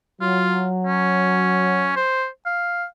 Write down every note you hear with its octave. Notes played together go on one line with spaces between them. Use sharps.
F#3 F4
C#4
C5
F5